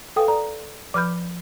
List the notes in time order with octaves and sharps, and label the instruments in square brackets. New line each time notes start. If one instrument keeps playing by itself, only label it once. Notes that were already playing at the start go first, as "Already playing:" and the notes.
[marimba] A4 G5 D#6 [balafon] B4 F5 G#5
[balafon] D5 [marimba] A#5
[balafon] F3 B4 B5 [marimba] D6 F6 G6